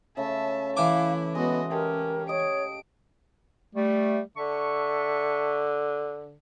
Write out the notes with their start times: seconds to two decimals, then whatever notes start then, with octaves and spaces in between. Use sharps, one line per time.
0.17 C#3 A3 E5 A5
0.77 E3 E4 F5 D6
1.35 G#3 B3 F#4 D#5
1.71 C#4 G4 A#4 A5
2.29 C#5 D#5 D7
3.75 G3 A3
4.37 D3 E5 A5 C#6